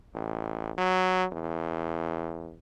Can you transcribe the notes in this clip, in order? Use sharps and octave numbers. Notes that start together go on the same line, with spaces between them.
A1
F#3
E2